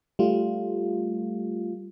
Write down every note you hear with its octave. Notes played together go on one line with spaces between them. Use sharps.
G3 A3 F4